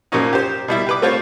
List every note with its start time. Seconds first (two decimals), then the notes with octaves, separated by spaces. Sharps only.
0.12 F#2 A#2 F3 A#3 C#4 D#4
0.33 G4 C5
0.68 B2 G3 E4
0.87 G4 B4 D6
1.02 A3 C4 F4 C5 C#5